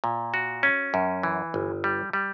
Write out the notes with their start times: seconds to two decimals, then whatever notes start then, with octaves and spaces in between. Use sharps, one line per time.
0.04 A#2
0.34 F#4
0.63 C#4
0.94 F#2
1.23 E3
1.54 G1
1.84 G3
2.13 G3